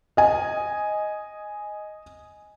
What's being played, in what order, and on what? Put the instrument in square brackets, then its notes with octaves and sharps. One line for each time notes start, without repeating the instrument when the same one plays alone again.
[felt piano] D#5 G#5